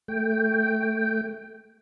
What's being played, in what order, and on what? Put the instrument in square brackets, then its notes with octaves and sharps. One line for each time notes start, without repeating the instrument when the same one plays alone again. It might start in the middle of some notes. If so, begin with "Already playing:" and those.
[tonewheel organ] A3 G5